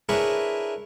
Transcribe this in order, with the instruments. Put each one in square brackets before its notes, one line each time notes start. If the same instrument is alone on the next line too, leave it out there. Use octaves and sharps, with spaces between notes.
[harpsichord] D4 E4 G#4 A#4 B4 C#5